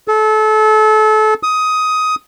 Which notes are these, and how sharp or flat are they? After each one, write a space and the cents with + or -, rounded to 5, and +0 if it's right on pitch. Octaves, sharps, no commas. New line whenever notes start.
A4 -30
D#6 +15